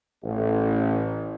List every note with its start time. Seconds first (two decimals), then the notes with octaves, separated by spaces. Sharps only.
0.23 A1